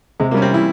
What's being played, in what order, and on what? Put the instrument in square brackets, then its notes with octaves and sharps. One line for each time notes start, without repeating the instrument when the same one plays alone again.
[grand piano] C3 [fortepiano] G#3
[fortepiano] A#3
[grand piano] G3 [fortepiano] C#4
[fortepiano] C4
[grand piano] E3 [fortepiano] E4